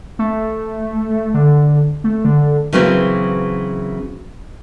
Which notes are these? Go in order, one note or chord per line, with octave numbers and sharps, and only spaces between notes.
A3
D3
A3
D3
C#3 E3 F#3 A#3 C4